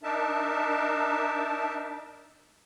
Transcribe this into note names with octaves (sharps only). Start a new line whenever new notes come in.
D4 D#4 A#4 E5 A5